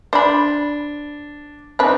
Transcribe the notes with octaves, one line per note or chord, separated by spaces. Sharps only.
D4 C5 B5
C4 D4 D#4 B4